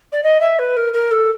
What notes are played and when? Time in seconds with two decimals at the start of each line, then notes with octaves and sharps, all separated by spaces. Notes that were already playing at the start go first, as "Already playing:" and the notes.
0.12 D5
0.23 D#5
0.40 E5
0.58 B4
0.76 A#4
0.93 A#4
1.11 A4